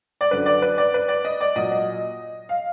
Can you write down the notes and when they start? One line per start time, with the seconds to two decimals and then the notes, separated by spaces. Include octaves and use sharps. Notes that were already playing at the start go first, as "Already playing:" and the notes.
0.21 D5
0.31 F#2 D3 F#3 B4
0.46 D5
0.62 B4
0.78 D5
0.94 B4
1.08 D5
1.24 D#5
1.41 D5
1.56 A#2 F#3 D#5
1.72 D#5
2.49 F5